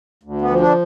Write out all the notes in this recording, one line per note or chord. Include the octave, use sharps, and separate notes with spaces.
D2
B3
F3
D3 D4